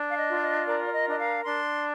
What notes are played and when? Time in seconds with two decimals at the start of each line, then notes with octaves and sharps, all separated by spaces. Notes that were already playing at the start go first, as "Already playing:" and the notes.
Already playing: D4
0.10 F5
0.16 D#5
0.28 F4
0.41 D#5
0.67 A#4 D5
0.84 D5
0.93 D#5
1.05 D4 D#5
1.18 F5
1.43 D4 C6